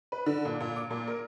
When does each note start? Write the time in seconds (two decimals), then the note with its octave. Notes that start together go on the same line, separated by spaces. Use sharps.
0.12 B4
0.26 D3
0.45 A#2
0.60 A#2
0.76 D6
0.90 A#2
1.08 A#4